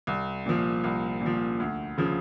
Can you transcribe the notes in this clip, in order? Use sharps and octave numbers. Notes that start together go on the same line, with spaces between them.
C2
A#2 F3
C2
A#2
F3
D2
C#3 F3